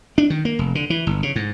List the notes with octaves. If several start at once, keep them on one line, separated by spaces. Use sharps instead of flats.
D4
D#3
A#3
F1
D3
E3
G1
C#3
G#2